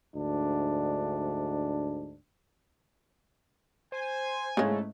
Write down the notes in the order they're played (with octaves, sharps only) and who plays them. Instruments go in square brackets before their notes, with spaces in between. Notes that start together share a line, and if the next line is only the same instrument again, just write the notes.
[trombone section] D2 G#2 D4
[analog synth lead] C5 [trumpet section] G#5
[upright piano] G#2 C#4 E4 [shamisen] C#3 G#3 [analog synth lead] A3